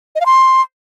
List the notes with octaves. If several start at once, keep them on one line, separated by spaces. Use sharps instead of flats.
D#5
F5
C6